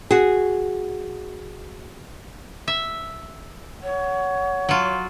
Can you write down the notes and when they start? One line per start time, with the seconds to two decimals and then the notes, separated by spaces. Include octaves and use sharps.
0.11 F#4 G#4
2.68 E5
3.83 C#5 F#5
4.69 F#3 F4